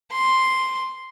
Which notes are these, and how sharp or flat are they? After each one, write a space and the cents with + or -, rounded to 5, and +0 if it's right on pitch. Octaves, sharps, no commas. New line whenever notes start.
C6 +0